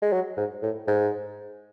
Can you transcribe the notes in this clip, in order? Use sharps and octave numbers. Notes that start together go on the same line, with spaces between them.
G#3
F#3
G#2
A2
G#2